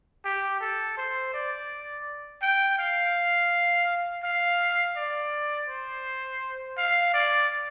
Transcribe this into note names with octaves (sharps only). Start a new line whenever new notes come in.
G4
A4
C5
D5
G5
F5
F5
D5
C5
F5
D5